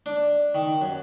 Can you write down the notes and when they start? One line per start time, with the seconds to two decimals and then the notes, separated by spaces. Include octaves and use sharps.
0.06 D4
0.55 D#3
0.82 F#2